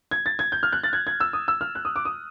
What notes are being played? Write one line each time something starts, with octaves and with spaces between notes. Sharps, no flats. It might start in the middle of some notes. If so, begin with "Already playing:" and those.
G#6
A6
G#6
G6
F6
F#6
A6
G#6
G#6
E6
D#6
E6
F6
F#6
D#6
D6
D#6